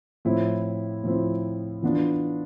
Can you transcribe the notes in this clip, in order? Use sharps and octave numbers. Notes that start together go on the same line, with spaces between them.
A2 F3 C4 E4
A2 F3 C4 E4
E3 B3 D4 F4